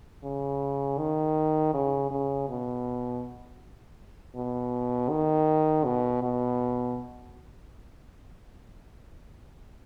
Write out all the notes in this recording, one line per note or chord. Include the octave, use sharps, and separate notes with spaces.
C#3
D#3
C#3
C#3
B2
B2
D#3
B2
B2